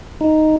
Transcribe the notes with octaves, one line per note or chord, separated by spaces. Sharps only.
D#4